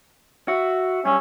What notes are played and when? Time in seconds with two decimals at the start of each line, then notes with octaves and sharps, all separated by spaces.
0.48 F#4 E5 E6
1.05 G2 C#4 E6 G#6